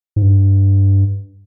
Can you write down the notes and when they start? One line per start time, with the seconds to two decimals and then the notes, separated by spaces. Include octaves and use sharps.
0.16 G#2
0.22 G2